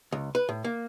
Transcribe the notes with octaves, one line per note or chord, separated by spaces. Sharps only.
C#2
B4
A2
A#3